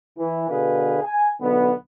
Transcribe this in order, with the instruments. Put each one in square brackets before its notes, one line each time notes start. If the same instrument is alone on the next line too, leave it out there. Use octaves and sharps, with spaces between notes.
[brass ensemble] E3
B2 D3 G#4 B4 F5
G#5
B1 D3 B3